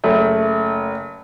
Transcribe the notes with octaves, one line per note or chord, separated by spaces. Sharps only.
F#1 A3